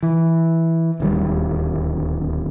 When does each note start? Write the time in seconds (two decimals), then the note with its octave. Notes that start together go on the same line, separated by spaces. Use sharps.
0.03 E3
1.00 D1 D#2 G3